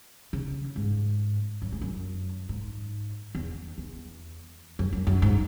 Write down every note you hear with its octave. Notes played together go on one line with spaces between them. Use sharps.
C#3
G#2
F#2
G#2
F#2
G#2
E2
E2
F#2
F#2
F#2
G#2